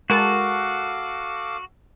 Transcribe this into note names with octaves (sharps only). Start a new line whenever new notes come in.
G#3 F#4 A4 A#4 F5 A5 D6